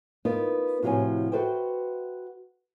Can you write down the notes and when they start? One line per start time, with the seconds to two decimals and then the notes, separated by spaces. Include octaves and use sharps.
0.25 B3 D#4 F4 A#4
0.83 A2 C3 F3 F#4 C#5 G#5
1.32 F#4 A4 B4 C5 E5 G5